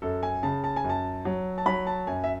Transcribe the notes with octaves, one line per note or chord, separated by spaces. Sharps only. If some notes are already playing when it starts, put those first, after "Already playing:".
F#2 A4
G#5
C#3 A5
A5
G#5
F#2
A5
F#3
A5
F#3 B5
A5
F#2 G#5
E5